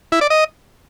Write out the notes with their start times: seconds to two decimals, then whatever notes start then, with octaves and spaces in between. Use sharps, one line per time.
0.12 E4
0.21 D5
0.30 D#5